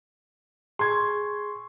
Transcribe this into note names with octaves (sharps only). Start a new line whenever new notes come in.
G#4 C6 C#6 G#6